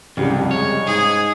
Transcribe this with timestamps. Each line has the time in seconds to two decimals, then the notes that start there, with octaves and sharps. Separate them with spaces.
0.17 C2 F2 C#3 G3
0.51 G#3 C#5
0.86 G#2 G#4